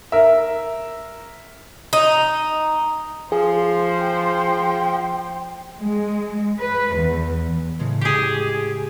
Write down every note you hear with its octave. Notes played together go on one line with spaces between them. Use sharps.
A#4 E5
D#4
F3 G#4 C5
G5
G#3
B4
E2
A2 C#3 G#3
G4 G#4 D6 C7